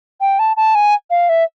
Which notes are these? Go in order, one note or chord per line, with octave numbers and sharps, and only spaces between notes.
G5
A5
A5
G#5
F5
E5